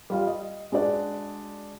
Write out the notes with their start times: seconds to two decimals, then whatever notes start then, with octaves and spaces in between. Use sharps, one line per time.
0.10 G3 F4 F5
0.27 D#5
0.72 G#3 D4 F#4 D5